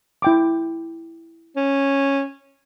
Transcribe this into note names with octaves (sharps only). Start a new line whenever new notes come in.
E4 G5 D6
C#4